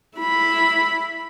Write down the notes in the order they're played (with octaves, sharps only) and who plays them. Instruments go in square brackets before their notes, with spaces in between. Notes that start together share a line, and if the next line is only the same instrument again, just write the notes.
[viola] E4 B5